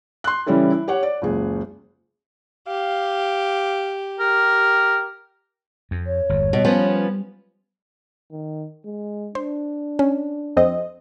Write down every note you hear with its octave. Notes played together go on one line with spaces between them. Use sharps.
C6 F#6
C#3 E3 G3 C#4 E4 A4
E4
G4 C#5 F#5
D5
F#1 C#2 G#4
G4 F5
G4 A#4
F2
C#5
G1 E2
B2 G3
F3 B3 C#4
D#3
G#3
D4 C5
C#4
F2 C4 D#5